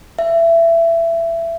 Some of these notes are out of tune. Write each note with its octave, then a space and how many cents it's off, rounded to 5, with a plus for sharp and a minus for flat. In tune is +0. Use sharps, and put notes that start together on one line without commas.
E5 +20